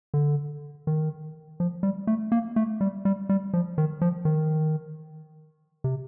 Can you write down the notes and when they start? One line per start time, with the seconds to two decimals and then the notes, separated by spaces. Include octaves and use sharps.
0.14 D3
0.87 D#3
1.60 F3
1.83 G3
2.07 A3
2.32 A#3
2.56 A3
2.81 G3
3.05 G3
3.29 G3
3.53 F3
3.78 D#3
4.01 F3
4.25 D#3
5.84 C3